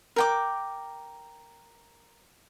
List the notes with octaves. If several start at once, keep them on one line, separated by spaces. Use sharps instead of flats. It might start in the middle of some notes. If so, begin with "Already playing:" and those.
A#4 G5 D6